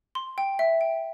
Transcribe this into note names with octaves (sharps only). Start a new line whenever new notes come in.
C6
G5
E5
G5